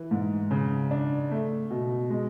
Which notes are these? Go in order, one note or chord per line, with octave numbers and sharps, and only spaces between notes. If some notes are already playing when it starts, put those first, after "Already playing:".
Already playing: E3
G#2
C#3
D4
A3
B2
G#3